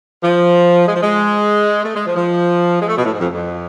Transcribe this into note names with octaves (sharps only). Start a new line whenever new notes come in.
F3
G#3
F3
G#3
A3
G#3
F3
F3
G#3
A3
B2
A2
G#2
F2
F2